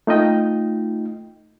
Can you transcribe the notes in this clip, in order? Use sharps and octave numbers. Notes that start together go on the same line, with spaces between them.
A3 D#4 F4 D#5 G5